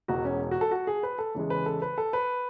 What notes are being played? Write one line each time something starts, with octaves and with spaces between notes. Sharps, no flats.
E1 E2 B2 G#3 F#4
C#4
F#4
A4
F#4
G#4
B4
A4
E2 C#3 E3 G#3
B4
A4
B4
A4
B4